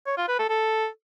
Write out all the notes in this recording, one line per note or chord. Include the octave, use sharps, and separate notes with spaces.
C#5
F4
B4
A4
A4